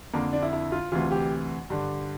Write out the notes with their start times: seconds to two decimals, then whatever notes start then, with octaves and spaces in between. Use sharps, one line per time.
0.13 F2 D3 A#3
0.33 D4
0.43 E4
0.53 E4
0.72 F4
0.92 D2 C3 E3 F4
1.11 G4
1.70 G2 D3